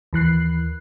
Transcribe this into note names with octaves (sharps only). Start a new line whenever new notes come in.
D#2 E3 F#6 C7